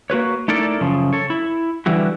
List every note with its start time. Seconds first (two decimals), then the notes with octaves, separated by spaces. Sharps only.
0.10 A#3 F#4 B4 C#5
0.48 A3 D#4 E4 A4 A#4 D5
0.81 F#2 C#3 F3
1.13 A4 C#5
1.30 E4
1.86 D3 E3 G3 E4 F#4